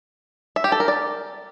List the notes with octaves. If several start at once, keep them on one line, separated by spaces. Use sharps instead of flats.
E5
G4
A4
A#4
D5